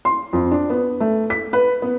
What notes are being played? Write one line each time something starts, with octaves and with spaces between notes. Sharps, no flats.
C6
F2
D4
B3
A3
B6
B4
B3